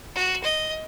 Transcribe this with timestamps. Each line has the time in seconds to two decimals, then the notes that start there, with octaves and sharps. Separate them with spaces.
0.15 F#4
0.44 D#5